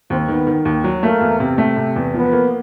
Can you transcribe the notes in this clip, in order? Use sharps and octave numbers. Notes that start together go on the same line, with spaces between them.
D#2 C4
D#3 B3
D#3
D#2
F#3
A3 A#3
E2
C3
A3
C3
E2
F3 B3
A#3